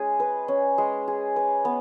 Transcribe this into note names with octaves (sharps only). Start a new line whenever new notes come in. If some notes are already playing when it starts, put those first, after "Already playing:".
Already playing: G#3 C#4 G#4
B4
C#4
G#3
G#4
B4
B3